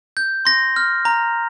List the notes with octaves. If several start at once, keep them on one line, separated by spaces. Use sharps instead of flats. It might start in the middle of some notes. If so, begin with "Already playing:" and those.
G6
C6 A#6
F6
A#5